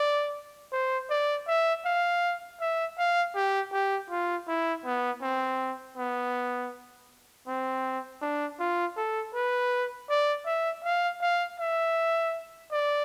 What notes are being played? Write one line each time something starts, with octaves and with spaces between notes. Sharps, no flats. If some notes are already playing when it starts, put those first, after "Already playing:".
Already playing: D5
C5
D5
E5
F5
E5
F5
G4
G4
F4
E4
B3
C4
B3
C4
D4
F4
A4
B4
D5
E5
F5
F5
E5
D5